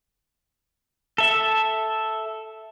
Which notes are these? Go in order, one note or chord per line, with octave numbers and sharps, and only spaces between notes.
A4 E5